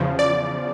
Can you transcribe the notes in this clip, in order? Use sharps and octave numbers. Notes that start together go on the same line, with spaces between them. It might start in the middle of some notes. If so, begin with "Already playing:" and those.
Already playing: E2 C#3 F3
D5